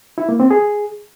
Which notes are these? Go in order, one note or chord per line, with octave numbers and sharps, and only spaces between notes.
E4
A#3
C4
G#4